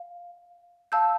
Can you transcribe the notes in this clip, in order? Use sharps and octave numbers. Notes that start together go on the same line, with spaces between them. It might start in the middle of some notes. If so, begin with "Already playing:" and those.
Already playing: F5
F5 A5 E6 G6